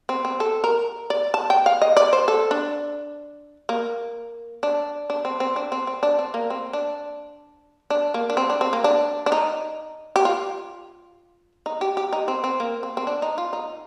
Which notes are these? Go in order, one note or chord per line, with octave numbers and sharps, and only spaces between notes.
C4
C4
A4
A#4
D5
A5
G5
F5
D#5
D5
C5
A4
D4
A#3
D4
D4
C4
C4
D4
C4
C4
D4
C4
A#3
C4
D4
D4
A#3
D4
C4
D4
C4
A#3
D4
D4
D#4
G4
F4
D#4
G4
G4
D#4
C4
C4
A#3
C4
C4
D4
D#4
F4
D#4